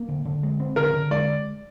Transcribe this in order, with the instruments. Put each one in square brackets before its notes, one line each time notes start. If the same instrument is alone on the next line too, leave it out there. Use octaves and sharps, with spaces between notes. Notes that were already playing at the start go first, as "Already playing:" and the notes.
Already playing: [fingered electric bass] A#3
D3
D3
G#3
C4
[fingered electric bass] D3 [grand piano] A#4
[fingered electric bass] D3
[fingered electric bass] G#3 [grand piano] D5